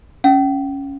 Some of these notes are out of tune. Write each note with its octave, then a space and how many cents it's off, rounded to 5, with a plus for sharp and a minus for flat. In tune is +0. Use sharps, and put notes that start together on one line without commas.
C#4 +0 F5 +0